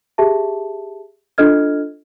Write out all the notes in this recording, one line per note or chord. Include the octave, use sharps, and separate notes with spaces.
G4 G#4 E5 A5
D4 F4 A4 D#5 F6 G#6